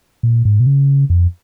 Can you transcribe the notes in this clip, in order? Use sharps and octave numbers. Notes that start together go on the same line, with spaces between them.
A#2
G#2
B2
C#3
F2